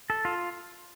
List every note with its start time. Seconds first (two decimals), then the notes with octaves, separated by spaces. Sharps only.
0.10 A4
0.25 F4